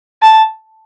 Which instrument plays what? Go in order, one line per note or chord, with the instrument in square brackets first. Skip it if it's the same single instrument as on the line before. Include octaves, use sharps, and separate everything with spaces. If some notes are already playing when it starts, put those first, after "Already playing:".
[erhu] A5